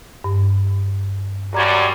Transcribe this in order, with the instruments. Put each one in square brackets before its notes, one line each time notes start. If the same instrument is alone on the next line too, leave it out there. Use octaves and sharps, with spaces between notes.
[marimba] G2
[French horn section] F#2 G3 [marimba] A#5 G#6 A6